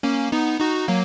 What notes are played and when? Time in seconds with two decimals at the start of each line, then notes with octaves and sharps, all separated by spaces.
0.03 A#3 C#4
0.32 B3 D#4
0.60 D#4 F#4
0.88 F#3 A#3